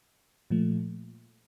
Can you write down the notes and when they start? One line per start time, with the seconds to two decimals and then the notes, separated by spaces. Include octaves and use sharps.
0.50 A#2 F3 A3